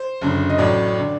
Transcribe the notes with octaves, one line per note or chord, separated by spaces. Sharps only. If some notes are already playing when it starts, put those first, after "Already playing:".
Already playing: C5
F#1 F#2 D3
D#5
A1 A2 F#3 D5
D3